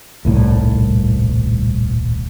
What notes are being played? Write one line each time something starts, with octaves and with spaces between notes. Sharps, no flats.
D#1 C2 A2